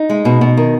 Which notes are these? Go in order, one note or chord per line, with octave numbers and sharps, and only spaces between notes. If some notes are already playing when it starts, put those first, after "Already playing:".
Already playing: D#4
G#3
B2
B2
D#3